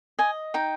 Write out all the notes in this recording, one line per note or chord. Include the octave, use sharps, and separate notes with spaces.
D#5 G#5
D#4 G5